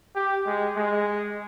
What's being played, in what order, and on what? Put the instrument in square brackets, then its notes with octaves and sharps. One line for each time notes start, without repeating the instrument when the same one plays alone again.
[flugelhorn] G4
G#3
G#3